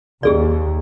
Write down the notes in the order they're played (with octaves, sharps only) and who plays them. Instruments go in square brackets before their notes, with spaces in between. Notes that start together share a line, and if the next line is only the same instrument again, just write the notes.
[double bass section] D#2 [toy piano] G4 G#4 D5